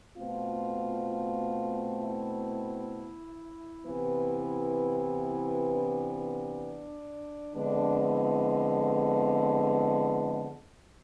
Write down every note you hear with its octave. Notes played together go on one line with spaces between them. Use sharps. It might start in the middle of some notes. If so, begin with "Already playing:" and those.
B2 A3 C4 F4
E4
C3 E3 B3
D4
F2 D3 G#3 B3 D4
E4